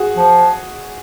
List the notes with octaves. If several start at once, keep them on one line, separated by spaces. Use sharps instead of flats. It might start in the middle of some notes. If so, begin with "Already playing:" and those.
Already playing: F#4 G#4
F3